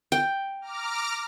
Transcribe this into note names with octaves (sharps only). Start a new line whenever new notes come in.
G5
A#5 D6 F6